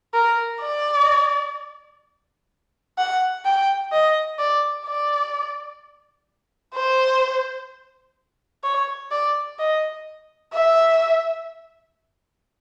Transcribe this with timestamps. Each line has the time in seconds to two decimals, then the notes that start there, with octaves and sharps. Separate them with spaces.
0.14 A#4
0.61 D5
2.98 F#5
3.45 G5
3.92 D#5
4.39 D5
4.86 D5
6.75 C5
8.64 C#5
9.11 D5
9.59 D#5
10.53 E5